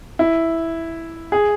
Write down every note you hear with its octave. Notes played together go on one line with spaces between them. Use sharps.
E4
G#4